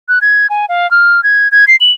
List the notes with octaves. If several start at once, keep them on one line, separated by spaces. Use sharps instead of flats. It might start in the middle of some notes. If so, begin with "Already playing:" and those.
F#6
G#6
G#5
F5
F6
G#6
G#6
C7
F#7